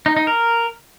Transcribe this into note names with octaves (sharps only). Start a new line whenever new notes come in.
D#4
D#4
A#4